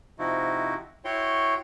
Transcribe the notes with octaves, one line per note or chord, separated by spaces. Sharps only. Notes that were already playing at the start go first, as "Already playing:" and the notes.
C3 F3 D#4 E4 F#4
E4 F#4 C#5 G5 C6